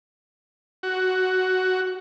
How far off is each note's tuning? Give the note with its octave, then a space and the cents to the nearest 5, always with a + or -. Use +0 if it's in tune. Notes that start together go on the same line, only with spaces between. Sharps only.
F#4 +10